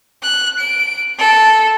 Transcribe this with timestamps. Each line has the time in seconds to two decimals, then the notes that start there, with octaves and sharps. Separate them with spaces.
0.23 F#6
0.59 D7
1.18 A4